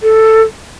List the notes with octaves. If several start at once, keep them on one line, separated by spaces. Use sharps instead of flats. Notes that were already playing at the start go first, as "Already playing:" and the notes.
A4